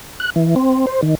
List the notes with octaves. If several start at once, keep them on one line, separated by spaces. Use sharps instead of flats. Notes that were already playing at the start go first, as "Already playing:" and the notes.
F#6
E3
C4
C5
D#3